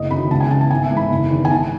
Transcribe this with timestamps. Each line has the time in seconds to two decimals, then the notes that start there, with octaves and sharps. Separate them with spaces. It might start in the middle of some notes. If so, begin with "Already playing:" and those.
Already playing: F#1 D#5
0.11 F#2 D#3 B5
0.31 C#2 A5
0.40 G#5
0.50 C#3 E3 A5
0.61 A5
0.71 G#1 G#5
0.84 E5
0.91 G#2 E3
0.97 B5
1.10 F#1
1.31 E2 D#3
1.45 G#5
1.51 G#1 A5